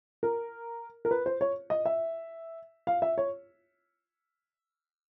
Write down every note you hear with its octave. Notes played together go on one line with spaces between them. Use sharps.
A#4
A#4
B4
C5
C#5
D#5
E5
F5
E5
C#5